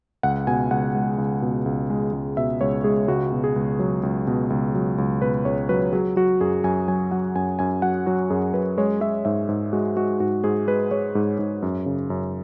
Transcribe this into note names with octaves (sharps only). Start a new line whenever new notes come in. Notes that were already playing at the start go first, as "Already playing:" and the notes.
C#2 F#5
B2 G#5
C#2 F#5
G#3
C#2
B2
C#2
G#3
C#2
B2 E5
C#2 C#5
G#3 G#4
C#2 F#4
B2
G#4
C#2
F#3
C#2
B2
C#2
F#3
C#2
B2 B4
C#2 C#5
F#3 B4
F#3 G#4
F#3 F#4
F#2 G#4
F#2 G#5
F#3 G#5
F#3 F#5
F#2 G#5
F#2 G#5
F#3 F#5
F#3 F#4
F#2 G#4
F#2 B4
G#3 C#5
G#3 E5
G#2 E5
G#2
G#3 F#4
G#3 F#4
G#2 F#4
G#2 G#4
G#3 B4
G#3 C#5
G#2
G#2
F#2
C#3
F#2